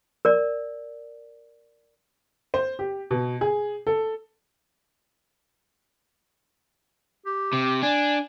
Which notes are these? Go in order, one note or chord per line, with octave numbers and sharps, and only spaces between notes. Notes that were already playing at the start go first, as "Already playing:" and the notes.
A#4 D5
C5
G4
B2
G#4
A4
G4
C3
D4 G#5